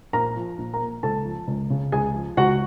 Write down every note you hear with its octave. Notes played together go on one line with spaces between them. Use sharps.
A#1 A#4 A#5
F3
A#1
A#4 A#5
A#2
C#2 A4 A5
F3
C#2
C#3
C#2 G#4 G#5
F3
C#2 F#4 F#5